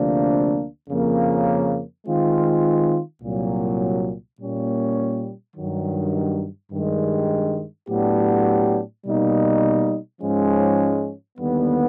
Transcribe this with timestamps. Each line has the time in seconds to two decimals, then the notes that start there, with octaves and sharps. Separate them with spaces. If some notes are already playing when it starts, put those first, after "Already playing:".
Already playing: D2 C3 F3 A#3 D4
0.89 F2 C#3 F3 A#3 C#4
2.06 D#3 G#3 C4 F4
3.22 C2 A#2 F#3
4.38 A#2 G3 A#3 C#4
5.55 G2 D#3 F#3
6.72 G2 D#3 G#3
7.88 A2 F#3 B3 D4 G4
9.05 B2 G3 A#3 D#4
10.21 G#2 F3 G#3 C#4
11.37 D#2 D3 G3 B3